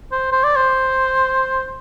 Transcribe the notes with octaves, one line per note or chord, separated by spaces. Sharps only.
C5
C5
D5
C5